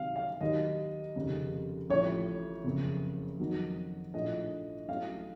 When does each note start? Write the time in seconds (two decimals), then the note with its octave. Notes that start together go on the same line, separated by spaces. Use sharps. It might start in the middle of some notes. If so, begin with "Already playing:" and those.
Already playing: C2 C3 D#3 F#3 F5
0.16 F5
0.41 D#2 D#3 F#3 D#5
1.16 F1 D#2 C#3
1.90 A1 A2 F3 C#5
2.64 F#1 F2 C#3
3.40 F2 D#3 F#3
4.14 A#1 A2 F3 D#5
4.88 A1 A2 F#3 F5